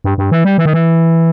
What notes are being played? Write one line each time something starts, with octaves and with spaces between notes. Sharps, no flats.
G2
G2
E3
G3
E3
D#3
E3